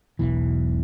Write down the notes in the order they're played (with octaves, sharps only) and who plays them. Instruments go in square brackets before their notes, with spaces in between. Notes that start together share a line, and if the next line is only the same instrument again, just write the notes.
[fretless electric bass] E1 B1 E2 E3